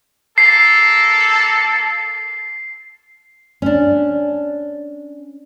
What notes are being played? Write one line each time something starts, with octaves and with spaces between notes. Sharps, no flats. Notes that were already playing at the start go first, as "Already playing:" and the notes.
A#3 A4 C7
C#4 D4